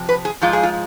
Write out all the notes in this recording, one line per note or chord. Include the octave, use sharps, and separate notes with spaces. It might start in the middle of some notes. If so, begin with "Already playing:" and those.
Already playing: C3 F3
B4
G#4
G#2 F3 G#3 F4
G#4
F4